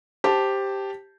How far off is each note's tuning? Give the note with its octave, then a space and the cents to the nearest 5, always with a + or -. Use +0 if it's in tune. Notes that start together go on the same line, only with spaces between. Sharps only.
G4 +0 C5 +0 A5 +0